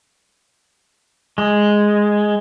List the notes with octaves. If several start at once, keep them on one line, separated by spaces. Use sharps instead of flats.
G#3